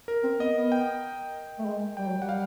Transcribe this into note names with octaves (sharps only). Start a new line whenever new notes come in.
A#4
C4
B3 D#5
B3
G5
A3
G#3
G3 G5
F#3
G3 F#5
F5